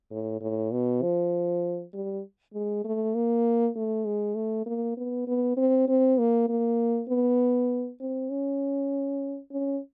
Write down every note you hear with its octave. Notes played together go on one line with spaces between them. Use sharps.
A2
A2
B2
F3
G3
G#3
A3
A#3
A3
G#3
A3
A#3
B3
B3
C4
C4
A#3
A#3
B3
C4
C#4
C#4